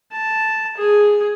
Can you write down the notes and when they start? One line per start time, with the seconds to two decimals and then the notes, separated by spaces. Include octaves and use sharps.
0.12 A5
0.77 G#4